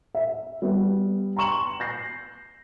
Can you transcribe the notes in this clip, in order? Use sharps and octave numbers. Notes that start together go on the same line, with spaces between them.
E5
G3 B3
A#5 C6 C#6 E7 F#7
G6 A#6 C7